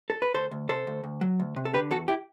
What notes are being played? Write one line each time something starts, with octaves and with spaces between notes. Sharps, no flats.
A4
B4
D2 A4 C5
D2
C3 A4 C5
D2
D2
F#3
D2
C3
A4
D3 G4 B4
E2 F#4 A4
E4 G4